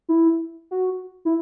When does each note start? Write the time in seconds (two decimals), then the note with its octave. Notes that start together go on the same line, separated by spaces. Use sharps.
0.09 E4
0.71 F#4
1.25 E4